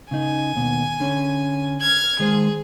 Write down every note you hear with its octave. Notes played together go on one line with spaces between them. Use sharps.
C#3 D#4 G#5
D#2 B2
D3 C#4
F6 G#6
D#3 G#3 G#4 C5